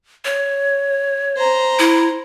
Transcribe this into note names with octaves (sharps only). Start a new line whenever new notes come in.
C#5
C5 A#5
E4